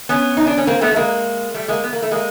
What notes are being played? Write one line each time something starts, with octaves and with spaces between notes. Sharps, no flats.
B3 C#4
D#4
D4
C#4
A#3 C4
A3 B3
A3
G#3 A#3
G3 A3
G#3 A#3
B3
A#3
A3
G#3 A#3